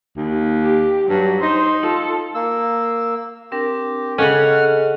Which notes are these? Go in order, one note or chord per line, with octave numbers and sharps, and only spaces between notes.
D#2
G4
G2 F#3
D#4 C5
F4 A4
A#3 E6
C4 D4 G4 A#4
C#3 C#4 A4 D#5 F#5 F6